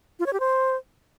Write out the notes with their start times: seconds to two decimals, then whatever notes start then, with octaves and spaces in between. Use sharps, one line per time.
0.19 F4
0.26 C#5
0.33 G4
0.40 C5